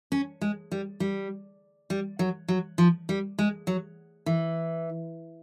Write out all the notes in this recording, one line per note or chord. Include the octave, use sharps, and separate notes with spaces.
C#4
G#3
G3
G3
G3
F#3
F#3
F3
G3
G#3
F#3
E3